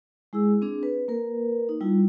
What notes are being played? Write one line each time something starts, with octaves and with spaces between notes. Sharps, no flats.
G#3 E4 G#4 E6
C4 D4 G#4
B4
A#3 A#4 B4
D#4
G3 E4 F4